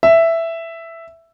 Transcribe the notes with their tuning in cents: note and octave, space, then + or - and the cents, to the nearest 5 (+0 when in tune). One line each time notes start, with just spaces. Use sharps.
E5 +5